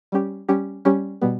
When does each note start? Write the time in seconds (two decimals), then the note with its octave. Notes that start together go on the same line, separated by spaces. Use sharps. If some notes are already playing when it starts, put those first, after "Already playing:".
0.12 G3 C#4 G4
0.48 G3 C#4 G4
0.85 G3 C#4 G4
1.21 B2 G3 B3